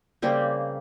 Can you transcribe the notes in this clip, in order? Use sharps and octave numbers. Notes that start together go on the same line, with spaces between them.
C#3 G3 A#3 C4